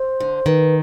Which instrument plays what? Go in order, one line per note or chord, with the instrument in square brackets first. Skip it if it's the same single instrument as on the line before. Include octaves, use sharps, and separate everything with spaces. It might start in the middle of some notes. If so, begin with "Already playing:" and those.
Already playing: [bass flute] C5
[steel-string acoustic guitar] D3
[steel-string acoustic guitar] D#3 [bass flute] B4